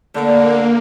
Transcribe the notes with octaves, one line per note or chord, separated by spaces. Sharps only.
D3 A3 A#3 D5